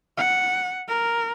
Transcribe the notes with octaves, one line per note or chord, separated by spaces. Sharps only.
F#5
A#4